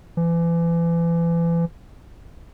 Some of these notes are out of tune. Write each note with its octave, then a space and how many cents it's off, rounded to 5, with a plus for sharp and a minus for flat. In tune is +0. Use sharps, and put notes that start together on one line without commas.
E3 +35